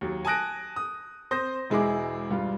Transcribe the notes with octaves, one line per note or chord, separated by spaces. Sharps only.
D#2 F#3
G#5 A5 D#6 F#6 A#6 D7
D#6
C4 C5 D#6 G6 A#6
E1 G#3 E4 G#4 D6
E1 G2 F4